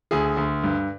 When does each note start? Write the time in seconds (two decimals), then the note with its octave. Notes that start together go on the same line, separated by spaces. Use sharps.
0.11 D2 G#4
0.37 D2
0.63 G2